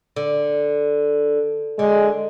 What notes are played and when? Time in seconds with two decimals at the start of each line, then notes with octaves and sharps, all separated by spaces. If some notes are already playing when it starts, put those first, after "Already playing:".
0.16 D3
1.79 D3 G#3